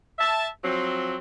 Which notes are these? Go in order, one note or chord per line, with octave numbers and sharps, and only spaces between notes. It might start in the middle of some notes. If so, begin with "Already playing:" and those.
E5 A5
F3 F#3 C4